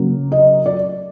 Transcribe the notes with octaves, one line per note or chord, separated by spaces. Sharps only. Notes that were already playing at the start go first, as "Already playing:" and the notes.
Already playing: C#3 F#3 A#3
D#5
D5